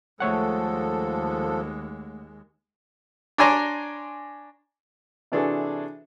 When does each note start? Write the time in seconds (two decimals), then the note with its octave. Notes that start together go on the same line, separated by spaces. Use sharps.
0.20 D#2 F3 G#3 A3 A4 C#5 F#5
3.38 D4 C#5 D5 G#5 A#5 C6
5.32 C3 E3 D4 F#4 G#4 A4